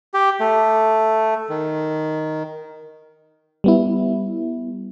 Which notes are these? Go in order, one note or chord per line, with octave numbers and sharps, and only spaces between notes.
G4
A3
D#3
G3 B3 E4